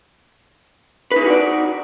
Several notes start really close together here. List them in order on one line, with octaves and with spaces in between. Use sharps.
B4 D#4 G#4 F#4 D5